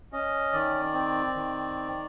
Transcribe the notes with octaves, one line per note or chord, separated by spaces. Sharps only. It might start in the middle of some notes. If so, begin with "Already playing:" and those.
C#4 D#5
D#3 D5
C4
D#3